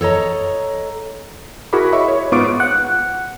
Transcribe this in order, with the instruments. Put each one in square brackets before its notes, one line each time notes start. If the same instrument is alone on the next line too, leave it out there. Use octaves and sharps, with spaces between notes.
[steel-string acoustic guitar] A4 C#5 D#5 A#5
[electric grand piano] E4 F#4 G#4 A#4 B5 D6
C#5 D#5 E5 B5 C#6
C#5
G#2 B3 F4 C#6 D6 D7
[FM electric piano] F#5